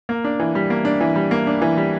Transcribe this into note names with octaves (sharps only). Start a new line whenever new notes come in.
A#3
D4
E3
G3
A#3
D4
E3
G3
A#3
D4
E3
G3